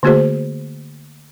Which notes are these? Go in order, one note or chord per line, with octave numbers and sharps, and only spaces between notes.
D3 A3 A#3 F#4 G#4 C5